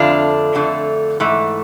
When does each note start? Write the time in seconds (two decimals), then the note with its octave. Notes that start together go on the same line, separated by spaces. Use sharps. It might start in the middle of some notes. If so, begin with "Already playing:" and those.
Already playing: F2 D3 A3 D4 F4
0.55 F2 D3 A3
1.20 G#2 E3 A3